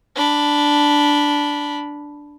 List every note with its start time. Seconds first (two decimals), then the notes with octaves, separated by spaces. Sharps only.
0.16 D4 B5